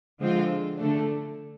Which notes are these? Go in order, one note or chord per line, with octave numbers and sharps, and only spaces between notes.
D3 F3 G#3 C4 F4
D3 A3 D4